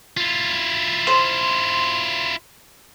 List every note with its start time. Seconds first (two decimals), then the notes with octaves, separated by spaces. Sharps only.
0.17 E4 F4
1.07 C5